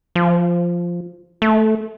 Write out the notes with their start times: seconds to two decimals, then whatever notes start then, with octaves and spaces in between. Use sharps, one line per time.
0.15 F3
1.42 A3